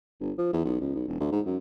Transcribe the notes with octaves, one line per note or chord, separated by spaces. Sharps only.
G1
F3
E2
B1
C#2
B1
E1
D2
G#2
F#2